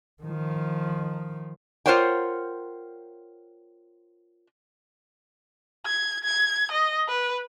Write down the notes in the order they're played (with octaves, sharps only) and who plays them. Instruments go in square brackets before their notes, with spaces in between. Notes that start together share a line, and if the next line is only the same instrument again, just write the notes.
[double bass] D#3 F3
[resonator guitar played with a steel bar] F4 A#4 C5 C#5 F#5 G5
[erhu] G#6
G#6
D#5
B4